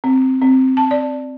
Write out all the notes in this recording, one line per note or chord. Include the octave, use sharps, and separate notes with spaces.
C4
C4
A5
D5